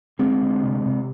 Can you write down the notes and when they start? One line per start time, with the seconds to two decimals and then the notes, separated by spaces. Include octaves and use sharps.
0.19 D2 G#3 C4
0.41 D2
0.63 C3
0.86 C3